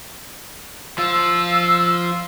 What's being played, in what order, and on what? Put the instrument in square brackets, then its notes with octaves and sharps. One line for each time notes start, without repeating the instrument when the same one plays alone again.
[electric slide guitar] F3 F4 [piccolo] E6